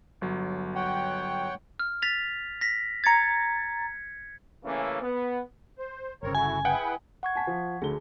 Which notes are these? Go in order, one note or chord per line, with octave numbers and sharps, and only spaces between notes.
G1 F#3
C#5 F#5 G5
F6
A6 B6 F7
A#6 B6
A#5 G#6 A6 C#7
C#3 E3 A3 A#3 C#4
B3
C5
G1 C#3 C4 A#4 C#5
A3 E4 F#4 G#5
E4 G#4 B4 F#5 G5
F#5 C#6 G#6
G#5 A5 B6
F3
D2 D3 G#4 G7